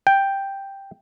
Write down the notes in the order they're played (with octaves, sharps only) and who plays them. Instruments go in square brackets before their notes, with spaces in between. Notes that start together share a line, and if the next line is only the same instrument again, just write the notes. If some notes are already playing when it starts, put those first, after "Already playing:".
[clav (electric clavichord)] G5